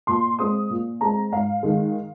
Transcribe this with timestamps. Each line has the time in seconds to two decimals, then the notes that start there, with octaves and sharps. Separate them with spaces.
0.07 A#2 C6
0.39 G#3 C4 D#6
0.70 A#2
1.01 G#3 C4 A#5
1.32 G#2 F5
1.63 D#3 G#3